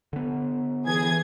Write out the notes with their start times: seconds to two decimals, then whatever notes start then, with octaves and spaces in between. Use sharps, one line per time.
0.13 D3 B3
0.87 E3 G#4 G#6